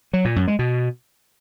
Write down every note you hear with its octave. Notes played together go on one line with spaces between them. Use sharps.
F#3
A#2
F#2
G#3
B2